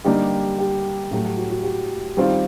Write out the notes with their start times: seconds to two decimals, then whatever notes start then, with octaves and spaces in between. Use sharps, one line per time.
0.05 D3 G3 A#3 D#4 G4
0.58 G4
1.11 A2 F#3 A3 G4
1.24 G4
1.37 F#4
1.50 F#4
1.63 G4
2.17 D#3 G3 C4 F4